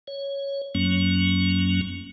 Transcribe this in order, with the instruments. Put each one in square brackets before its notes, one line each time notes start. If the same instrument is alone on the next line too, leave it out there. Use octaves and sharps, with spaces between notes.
[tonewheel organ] C#5
F#2 F#3 A#3 C#4